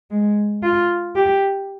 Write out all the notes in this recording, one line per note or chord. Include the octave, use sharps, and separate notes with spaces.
G#3
F4
G4